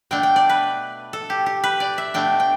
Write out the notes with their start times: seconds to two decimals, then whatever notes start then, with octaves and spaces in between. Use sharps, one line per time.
0.11 B2 A3 D4 G5
0.23 G5
0.36 D5
0.50 B4
1.13 A4
1.30 G4
1.46 G4
1.64 B4
1.80 D5
1.98 E5
2.14 B2 A3 D4 G5
2.40 G5